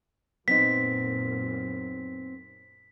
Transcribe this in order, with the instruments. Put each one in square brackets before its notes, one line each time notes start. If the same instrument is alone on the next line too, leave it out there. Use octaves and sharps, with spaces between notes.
[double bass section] F#2 A#2 [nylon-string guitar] B3 C4 D#4 [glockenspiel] B6